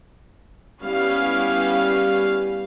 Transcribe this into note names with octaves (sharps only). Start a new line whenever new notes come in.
G3 B3 C#4 E4 F5